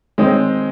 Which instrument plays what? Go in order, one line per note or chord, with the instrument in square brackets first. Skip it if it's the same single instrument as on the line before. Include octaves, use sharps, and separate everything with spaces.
[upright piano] D#3 G#3 C4 D#4